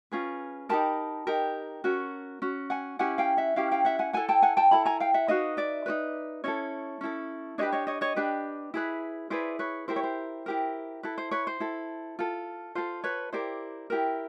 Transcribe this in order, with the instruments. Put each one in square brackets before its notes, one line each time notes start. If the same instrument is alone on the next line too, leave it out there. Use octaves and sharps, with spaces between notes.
[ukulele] C#4 F4 G#4 B4
D#4 G4 A#4 A5 B5
D#4 G4 A#4
C#4 F#4 A#4
C#4 F#4
F#5 G#5
C#4 E4 G4 F#5 G#5
F5 G5
E5 F#5
C#4 E4 G4 F5 G5
F5 G5
E5 F#5
F#5 G#5
E4 A4 F#5 G#5
G5 A5
F#5 G#5
G5 A5
E4 A4 A5 B5
G#5 A#5
F5 G5
E5 F#5
D#4 F#4 B4 D#5 F5
D5 E5
D#4 F#4 B4
C#4 E4 A4 C#5 D#5
C#4 E4 A4
D4 G4 B4 C#5 D#5
C#5 D#5
C#5 D#5
C#5 D#5
D4 G4 B4
E4 G#4 B4
E4 G#4 B4 C5 D5
B4 C#5
E4 G4 A#4 C5
C#5
C5
E4 G4 A#4
E4 A4 B4
C5
B4 C#5
C5
E4 A4
F4 A4
F4 A4 C5
B4 C#5
E4 G4 A#4 C5 D5
E4 G4 A#4